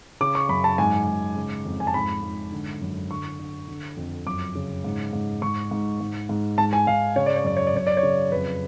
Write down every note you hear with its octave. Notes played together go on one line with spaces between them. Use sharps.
C#3 D6
C#6
F#2 B5
A5
G#2 G#5
G#2
C#3
F2
G#5
A5
G#2 B5
G#2
D3
F#2
D3 C#6
D3
D3
F2
F#2 D6
C#3
G#2
G#2
G#2 C#6
G#2
G#2
G#2
G#2 A5
G#5
G#2 F5
C#3 C#5
D5
C#5
F#2 D5
C#5
D5
F#2 C#5
D5
C#5
C#3
F2 B4